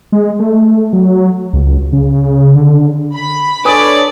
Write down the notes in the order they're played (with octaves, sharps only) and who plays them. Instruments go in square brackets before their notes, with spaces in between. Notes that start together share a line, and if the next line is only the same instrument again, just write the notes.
[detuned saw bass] G#3
A3
F#3
C#2
C#3
D3
[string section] B5
[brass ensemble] D4 A4 C#5 [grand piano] B4 G#5 D#6 [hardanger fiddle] D5 D6